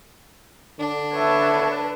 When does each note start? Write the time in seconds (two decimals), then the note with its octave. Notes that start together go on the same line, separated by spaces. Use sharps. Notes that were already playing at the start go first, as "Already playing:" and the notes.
0.79 D3 D4
1.13 B4 C#5 E5 A5